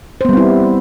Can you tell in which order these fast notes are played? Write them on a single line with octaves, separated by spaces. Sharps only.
C5 B3 G3 C4 E4